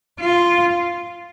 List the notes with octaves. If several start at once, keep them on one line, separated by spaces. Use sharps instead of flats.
F4